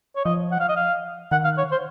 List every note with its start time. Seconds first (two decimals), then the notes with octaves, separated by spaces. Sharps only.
0.16 C#5
0.25 F3 D#5
0.52 F#5
0.60 F5
0.69 D#5
0.77 F5
1.32 D#3 F#5
1.44 F5
1.58 C#5
1.72 C5